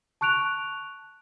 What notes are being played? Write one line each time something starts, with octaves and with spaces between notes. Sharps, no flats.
A5 C#6 F#6 D7 F7